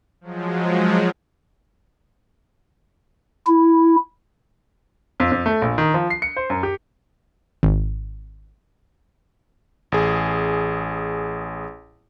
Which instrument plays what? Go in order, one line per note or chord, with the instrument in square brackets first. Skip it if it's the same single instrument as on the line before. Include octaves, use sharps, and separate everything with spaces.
[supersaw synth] F3 F#3 G#3
[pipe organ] E4
[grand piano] F2
F2
A3
A#1
D#3
F3
C7
C#7
C5
F#2
G4
[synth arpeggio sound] G#1
[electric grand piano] A1 G#4